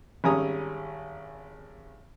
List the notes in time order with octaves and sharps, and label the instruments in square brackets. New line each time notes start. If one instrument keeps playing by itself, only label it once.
[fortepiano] G#1 G3 C#4 G#5 A#5 D#6